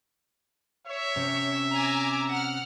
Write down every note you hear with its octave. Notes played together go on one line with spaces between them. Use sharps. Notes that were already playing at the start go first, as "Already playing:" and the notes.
C#5 E5
C3 C#4
G#5 A#5 D6
F#5 F6